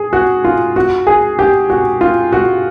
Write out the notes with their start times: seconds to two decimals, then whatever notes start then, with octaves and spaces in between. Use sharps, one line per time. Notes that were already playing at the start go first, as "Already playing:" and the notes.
Already playing: G#4
0.13 F#4
0.44 F4
0.76 F#4
1.07 G#4
1.39 G4
1.70 F#4
2.01 F4
2.32 F#4